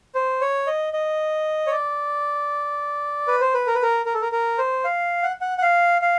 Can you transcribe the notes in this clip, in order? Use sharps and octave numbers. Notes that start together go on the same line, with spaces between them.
C5
C#5
D#5
D#5
C#5
D5
B4
C5
B4
A#4
B4
A#4
A#4
A4
A#4
A#4
C5
F5
F#5
F#5
F#5
F5
F5